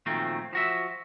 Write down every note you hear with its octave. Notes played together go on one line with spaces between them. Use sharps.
A#2 D#3 F3 F#3 A3 C4
F3 F#4 E5